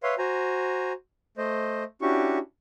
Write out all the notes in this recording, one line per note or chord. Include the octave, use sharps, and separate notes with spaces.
B4 C#5 E5 F5 C6
F#4 C5 G#5 A#5
A3 C5 D#5
C#4 D4 E4 F#4 G4 C#6